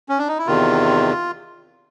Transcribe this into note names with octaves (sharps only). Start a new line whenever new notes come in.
C#4
D4
D#4
E4
E2 C3 D#3 F4